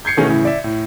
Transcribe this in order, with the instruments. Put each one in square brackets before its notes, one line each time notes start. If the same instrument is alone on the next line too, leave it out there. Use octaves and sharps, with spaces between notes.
[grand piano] G6 G#6 C7 C#7
B2 D#3 E3 A3 C#4 G#4
A2 C#3 E3
D5 E5
A2